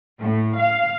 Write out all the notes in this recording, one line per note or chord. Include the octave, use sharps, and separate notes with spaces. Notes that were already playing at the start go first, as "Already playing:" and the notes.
A2
F5